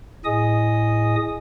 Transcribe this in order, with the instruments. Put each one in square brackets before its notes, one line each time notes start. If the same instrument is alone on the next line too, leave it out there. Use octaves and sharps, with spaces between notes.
[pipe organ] A2 G#4 D#5 G#5 D#6